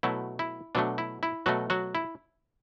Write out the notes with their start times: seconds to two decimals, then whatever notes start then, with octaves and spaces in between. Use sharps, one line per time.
0.03 B2 F#3 A3 E4
0.39 E4
0.75 B2 F#3 A3 D4
0.98 E4
1.23 E4
1.46 B2 F#3 A3 F#4
1.70 F#3 F#4
1.95 E4